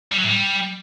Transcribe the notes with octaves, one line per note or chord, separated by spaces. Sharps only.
G3
F#3
A2
G3